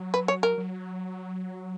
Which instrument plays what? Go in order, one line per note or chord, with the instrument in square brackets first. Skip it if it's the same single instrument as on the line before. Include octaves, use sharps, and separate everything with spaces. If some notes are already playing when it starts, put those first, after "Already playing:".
Already playing: [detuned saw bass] F#3
[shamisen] B4
C#5
A#4
[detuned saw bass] F#3